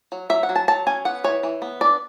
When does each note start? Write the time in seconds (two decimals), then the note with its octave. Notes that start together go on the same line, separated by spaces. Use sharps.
0.12 F#3
0.30 F#3 E5
0.43 F#5
0.49 F#3
0.56 A5
0.68 F#3 A5
0.87 C#4 G#5
1.05 B3 F#5
1.24 E3 C#5
1.43 E3
1.62 B3
1.81 D4 D5